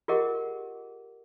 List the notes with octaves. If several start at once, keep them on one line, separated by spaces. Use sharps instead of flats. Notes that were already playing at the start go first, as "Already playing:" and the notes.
F4 G4 G#4 A#4 D#5 F#5